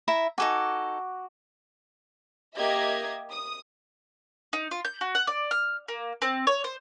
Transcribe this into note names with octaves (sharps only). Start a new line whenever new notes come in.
E4 E5 A#5
D#4 F#4 A4 G#5 D6
A#3 G4 D#5 E5 G#6
D#6
D#4
F4
G6
F#4
F#5
D5
F6
A#3
C4
C#5
C5